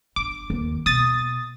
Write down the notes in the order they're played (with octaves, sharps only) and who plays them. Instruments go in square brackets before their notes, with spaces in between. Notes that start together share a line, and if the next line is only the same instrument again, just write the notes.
[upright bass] G1 [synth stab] D6
[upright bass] D#2
[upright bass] B2 [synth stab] D#6 A6